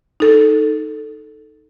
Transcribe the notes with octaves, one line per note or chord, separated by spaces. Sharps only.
D#4 A4